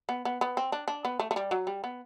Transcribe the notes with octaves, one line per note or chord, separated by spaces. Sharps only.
B3
B3
B3
C4
D4
D4
B3
A3
A3
G3
F#3
G3
B3